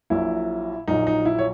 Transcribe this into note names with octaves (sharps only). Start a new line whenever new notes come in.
A#1 A#2 F#3 E4
A#1 A#2 F#3 D#4
D#4
E4
C#5